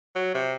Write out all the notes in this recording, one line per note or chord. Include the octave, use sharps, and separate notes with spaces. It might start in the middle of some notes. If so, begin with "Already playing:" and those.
F#3
C3